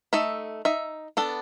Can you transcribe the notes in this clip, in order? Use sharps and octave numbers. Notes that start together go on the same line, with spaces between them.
A3 D#4 A4 E5
D#4 E5
B3 D4 A4